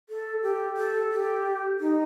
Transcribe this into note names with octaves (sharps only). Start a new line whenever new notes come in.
A4
G4
A4
G4
D#4